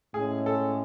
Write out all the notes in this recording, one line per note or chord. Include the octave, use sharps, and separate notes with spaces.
A2 G#3 C#4 G#4
A4